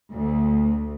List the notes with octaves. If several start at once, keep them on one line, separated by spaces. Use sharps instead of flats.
D2